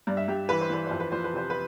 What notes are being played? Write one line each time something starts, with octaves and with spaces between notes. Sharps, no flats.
G2 D5
E5
G2 G4
E3 B4
C5
E3 B4
F2 C5
B4
F3 C5
B4
C3 C5
B4